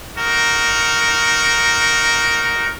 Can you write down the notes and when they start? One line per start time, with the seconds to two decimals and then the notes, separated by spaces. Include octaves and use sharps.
0.18 D#4 F#4 A#4